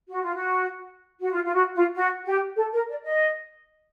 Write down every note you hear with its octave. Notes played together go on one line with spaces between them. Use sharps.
F#4
F4
F#4
F#4
F4
F4
F#4
F4
F#4
G4
A4
A#4
D5
D#5